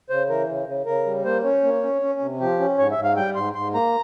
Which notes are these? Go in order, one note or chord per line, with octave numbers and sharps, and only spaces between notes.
C#3 C5
E3 A#4
C#3
C#3
C#3 A#4
G3
A#3 C5
C#4 C#5
A#3
C#4
C#4
C3
F3 G4
C#4
G#2 C#5
E5
G#2
F5
G3 G5
G#2 C6
G#2 C6
A#3 A#5